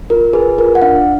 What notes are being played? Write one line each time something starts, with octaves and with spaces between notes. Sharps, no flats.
F4 A#4
G#4 B4
F4 A#4
F#5
D4 F5